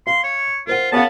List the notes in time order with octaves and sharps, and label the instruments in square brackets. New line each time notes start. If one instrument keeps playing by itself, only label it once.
[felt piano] F5 [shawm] C6
[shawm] C#5
[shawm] F4 [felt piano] A#4 C5 F#5
[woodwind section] C#3 B3 [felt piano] A#4 C#5 F5 [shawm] A5